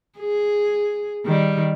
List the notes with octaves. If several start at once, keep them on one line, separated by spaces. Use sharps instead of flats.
G#4
D#3 G3